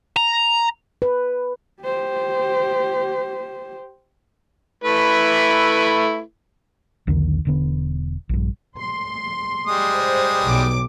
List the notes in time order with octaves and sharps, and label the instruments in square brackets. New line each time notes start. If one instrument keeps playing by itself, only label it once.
[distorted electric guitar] A#5
[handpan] B4
[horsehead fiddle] G4 C5
[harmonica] A3 E4 B4
[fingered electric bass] B1 E2 D3 D#3
E1 D3 B3
A#1 G2
[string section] C6
[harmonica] G3 G#3 D#6
[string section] C5
B1 D6